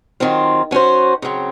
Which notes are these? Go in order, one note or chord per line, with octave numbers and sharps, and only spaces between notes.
D#3 F#3 C4 F4
F#3 C#4 F#4 C5
C#3 F#3 C4